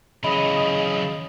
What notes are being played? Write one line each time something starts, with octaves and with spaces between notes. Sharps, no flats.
C#3 E3 F#3 D#5 B5